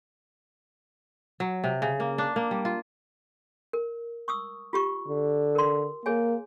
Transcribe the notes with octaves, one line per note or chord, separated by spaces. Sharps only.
F#3
C3
C#3
A#3
D4
A#3
G3
F4
A#4
C#6 D#6 E6
F4 G4 C#6
D3
A#4 C6
A#3 G#4 C#5 G#5